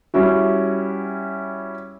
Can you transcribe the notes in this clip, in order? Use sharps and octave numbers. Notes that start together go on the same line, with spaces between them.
G3 C#4 E4 F#4